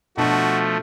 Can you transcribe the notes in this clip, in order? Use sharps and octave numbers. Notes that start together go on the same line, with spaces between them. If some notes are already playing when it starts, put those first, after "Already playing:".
B2 F3 A3 D4 F#4